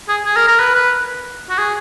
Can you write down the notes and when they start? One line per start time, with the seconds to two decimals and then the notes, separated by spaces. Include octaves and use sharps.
0.08 G#4
0.25 G#4
0.36 A#4
0.48 A#4
0.59 B4
0.75 B4
1.50 F#4
1.58 G#4